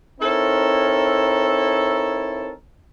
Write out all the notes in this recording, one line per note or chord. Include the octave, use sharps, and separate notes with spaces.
C4 D#4 E4 A4 A#4 C#5